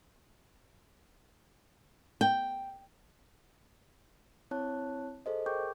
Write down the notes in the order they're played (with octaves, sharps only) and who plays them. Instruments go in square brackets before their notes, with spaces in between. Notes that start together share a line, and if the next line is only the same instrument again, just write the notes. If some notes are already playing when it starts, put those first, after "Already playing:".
[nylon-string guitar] G5
[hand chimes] C4 E4 C#5 A5 F#6
G#4 A4 C5 D#5
G#4 A#4 G5 C#6 D6 G6